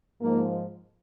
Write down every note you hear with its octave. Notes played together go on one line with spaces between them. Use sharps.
G#2 F3 A#3